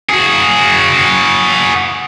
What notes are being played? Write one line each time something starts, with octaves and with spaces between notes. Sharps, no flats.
F#4 G#4